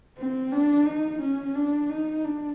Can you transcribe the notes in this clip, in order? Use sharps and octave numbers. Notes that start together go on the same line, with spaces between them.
C4
D4
D#4
C#4
D4
D#4
D4